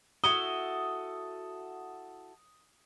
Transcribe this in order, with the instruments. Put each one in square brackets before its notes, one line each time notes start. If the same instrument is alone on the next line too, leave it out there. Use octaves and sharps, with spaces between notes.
[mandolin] E4 F#4 A4 [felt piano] D#6 [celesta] G7